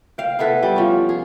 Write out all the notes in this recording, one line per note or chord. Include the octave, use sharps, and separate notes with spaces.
F5 G5
B3 E4 A4 B4
G3
F3 C#4
G#4